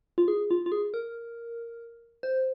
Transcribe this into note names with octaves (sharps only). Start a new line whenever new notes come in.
F4
G#4
F4
F4
G#4
A#4
C5